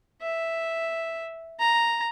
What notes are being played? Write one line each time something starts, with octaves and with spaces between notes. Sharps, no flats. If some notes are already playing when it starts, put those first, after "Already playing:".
E5
A#5